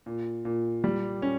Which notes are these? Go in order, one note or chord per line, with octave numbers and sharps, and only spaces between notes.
A#2
A#2
G3
C#4